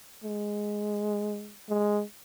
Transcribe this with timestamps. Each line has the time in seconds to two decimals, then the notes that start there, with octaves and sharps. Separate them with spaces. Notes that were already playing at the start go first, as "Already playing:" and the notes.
0.24 G#3
1.69 G#3